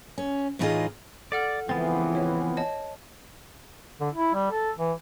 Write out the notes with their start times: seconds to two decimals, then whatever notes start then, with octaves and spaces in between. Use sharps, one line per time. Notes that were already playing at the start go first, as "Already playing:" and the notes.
0.18 C#4
0.59 A2 E3 D#4 F4 G#4 D#5
1.32 A4 D5 F#5 F6
1.69 C#2 E3 F3 B3 C4 A6
2.15 C#5 E5
2.57 C#5 D#5 A5
4.00 D3
4.14 E4
4.34 G3
4.51 A4
4.78 E3